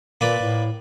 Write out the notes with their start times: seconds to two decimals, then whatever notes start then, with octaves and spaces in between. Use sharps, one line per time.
0.21 A#2 A#3 B4 D5
0.41 A2